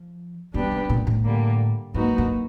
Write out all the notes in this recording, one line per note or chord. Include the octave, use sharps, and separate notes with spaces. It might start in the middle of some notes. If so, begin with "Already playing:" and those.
Already playing: F3
E3 G3 B3 D4 G4 B4
D#3
A#2
A2
D3 G3 A#3
G#2 F#3 A#3 D#4 F#4 B4
G2